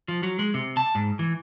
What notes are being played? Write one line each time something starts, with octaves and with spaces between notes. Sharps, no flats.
F3
F#3
G#3
C3
A5
G#2
E3